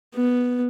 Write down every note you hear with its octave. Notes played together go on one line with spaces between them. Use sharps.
B3